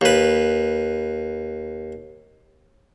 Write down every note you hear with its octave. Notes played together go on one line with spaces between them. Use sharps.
D#2 B4